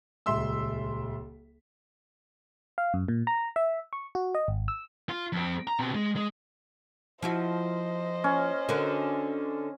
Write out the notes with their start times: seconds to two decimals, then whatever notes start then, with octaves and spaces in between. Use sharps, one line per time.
0.26 D#1 C#2 E5 C6 E6
2.78 F5
2.94 F#2
3.08 A#2
3.27 A#5
3.56 E5
3.93 C#6
4.15 F#4
4.35 D#5
4.48 G#1
4.68 E6
5.09 F4
5.32 F2 C4
5.67 A#5
5.79 B2 C4
5.95 G#3
6.16 G#3
7.22 F3 E4 F#4 C5 D#5
8.24 C#4
8.69 D3 F#4 A#4